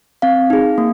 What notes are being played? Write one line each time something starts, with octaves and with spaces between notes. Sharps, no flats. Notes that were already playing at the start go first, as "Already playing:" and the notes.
C4 F5
D#4 G#4
A#3